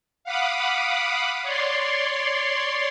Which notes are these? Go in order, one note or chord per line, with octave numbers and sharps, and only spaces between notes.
F5 F#5 B5 D6 D#6
C#5 D5 C6